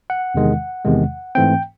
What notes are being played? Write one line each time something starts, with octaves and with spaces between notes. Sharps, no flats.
F#5
E2 C3 D#3 G#3
E2 C3 D#3 G#3
G#2 E3 A3 C4 G5